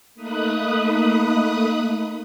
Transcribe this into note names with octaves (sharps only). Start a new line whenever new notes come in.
A3 A#3 D#4 B5 D#6 F#6